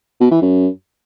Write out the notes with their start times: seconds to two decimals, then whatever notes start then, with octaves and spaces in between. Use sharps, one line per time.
0.21 B2
0.31 E3
0.42 F#2